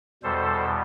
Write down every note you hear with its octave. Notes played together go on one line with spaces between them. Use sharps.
E2 B2 G3 A4 C5